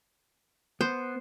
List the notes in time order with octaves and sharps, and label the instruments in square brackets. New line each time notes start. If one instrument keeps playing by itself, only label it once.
[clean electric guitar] B3 [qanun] C5